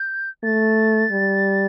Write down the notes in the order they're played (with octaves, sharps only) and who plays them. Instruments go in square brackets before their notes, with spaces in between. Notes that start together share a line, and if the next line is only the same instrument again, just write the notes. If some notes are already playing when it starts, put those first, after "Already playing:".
Already playing: [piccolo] G6
[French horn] A3 [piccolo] A6
[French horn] G3